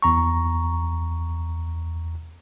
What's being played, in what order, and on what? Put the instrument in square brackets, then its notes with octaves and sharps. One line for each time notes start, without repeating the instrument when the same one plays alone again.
[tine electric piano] E2 A#5 C#6